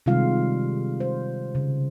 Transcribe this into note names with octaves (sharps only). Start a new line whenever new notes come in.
C3 D#3 G3 G#3 F4 F5
C5
C#3